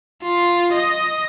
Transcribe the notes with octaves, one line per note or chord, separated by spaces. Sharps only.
F4
D#5